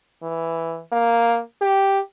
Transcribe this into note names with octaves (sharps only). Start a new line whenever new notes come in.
E3
A#3
G4